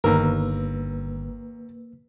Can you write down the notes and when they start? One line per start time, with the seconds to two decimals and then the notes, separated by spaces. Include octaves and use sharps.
0.04 G1 D#2 A#3 A#4 B4 E6